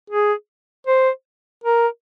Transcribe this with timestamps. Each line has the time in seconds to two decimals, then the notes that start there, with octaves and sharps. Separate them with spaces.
0.10 G#4
0.87 C5
1.64 A#4